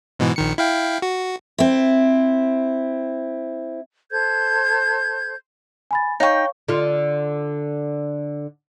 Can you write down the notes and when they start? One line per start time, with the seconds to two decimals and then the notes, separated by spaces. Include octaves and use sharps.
0.19 G#2 B2 E3
0.36 A#1 D#3 C#7
0.58 E4 F5 G5
1.02 F#4
1.58 C4 E4
4.11 A4 C5 G6 G#6
5.91 G#5 B5 A6
6.20 D#4 C#5 F5 G5 C#6
6.68 D3 F4